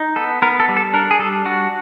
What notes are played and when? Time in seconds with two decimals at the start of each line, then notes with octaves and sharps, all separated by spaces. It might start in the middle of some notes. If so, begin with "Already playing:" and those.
Already playing: D#4
0.16 B3 A4
0.42 B3 A#4
0.60 A4
0.69 G3
0.77 A4
0.94 D4 A#4
1.11 G#4
1.19 G3 A4
1.45 D4 F#4